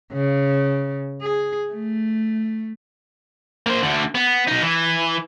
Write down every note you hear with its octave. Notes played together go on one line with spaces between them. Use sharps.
C#3
G#4
A3
A#3 C5
D2 D3
B3
B2 D#4
E3